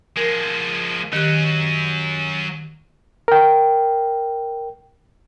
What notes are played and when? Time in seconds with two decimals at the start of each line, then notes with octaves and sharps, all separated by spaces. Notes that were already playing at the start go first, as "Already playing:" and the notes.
0.17 F3 G#3 A#4
1.13 D#3 F#3 C#4 G4 F#6
3.28 A#4 G5